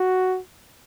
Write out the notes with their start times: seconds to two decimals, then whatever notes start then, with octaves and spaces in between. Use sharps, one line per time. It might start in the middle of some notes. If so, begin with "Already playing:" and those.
Already playing: F#4